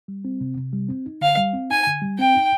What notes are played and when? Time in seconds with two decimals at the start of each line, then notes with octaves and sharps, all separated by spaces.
0.08 G3
0.25 C4
0.41 C3
0.57 C3
0.73 G3
0.89 C4
1.06 D#4
1.21 D3 F5
1.37 G3
1.53 C4
1.70 D#4 G#5
1.87 D3
2.02 G3
2.18 C4 G5
2.34 D#4